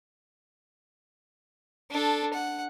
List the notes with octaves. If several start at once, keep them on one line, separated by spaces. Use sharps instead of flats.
D4 A4
F#5